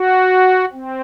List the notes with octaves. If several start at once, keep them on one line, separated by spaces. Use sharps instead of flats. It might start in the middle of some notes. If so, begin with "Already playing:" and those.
Already playing: F#4
C4